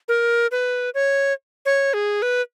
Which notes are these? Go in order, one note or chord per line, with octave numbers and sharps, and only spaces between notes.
A#4
B4
C#5
C#5
G#4
B4